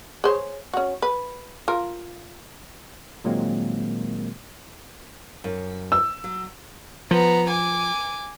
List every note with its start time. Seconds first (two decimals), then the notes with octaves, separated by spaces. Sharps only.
0.24 G#4 C5 C#5
0.73 C#4 F#4
1.02 B4
1.68 F4 A#4
3.24 A#2 D#3 F#3 G#3 A#3 C4
5.44 F#2
5.92 E6
6.24 F#3
7.11 F3 B3 A#5
7.50 G#5 D6